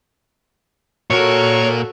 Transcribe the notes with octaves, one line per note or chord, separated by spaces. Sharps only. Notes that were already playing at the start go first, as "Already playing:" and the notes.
A#2 F#4 A4 A#4 C#5